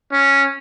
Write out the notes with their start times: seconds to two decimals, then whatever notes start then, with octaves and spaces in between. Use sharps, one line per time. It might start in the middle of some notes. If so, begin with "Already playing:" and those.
0.12 C#4